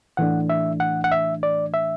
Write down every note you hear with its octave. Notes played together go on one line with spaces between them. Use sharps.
A2 E3 A3 D4 F#5
E5
F#5
F#5
E5
D5
E5